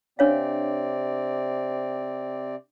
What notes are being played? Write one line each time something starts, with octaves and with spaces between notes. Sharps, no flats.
C3 C4 D4 C#5 D5 F5